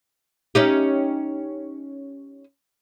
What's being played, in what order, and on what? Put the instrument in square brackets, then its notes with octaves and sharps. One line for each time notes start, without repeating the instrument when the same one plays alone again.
[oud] C#4 D#4 G4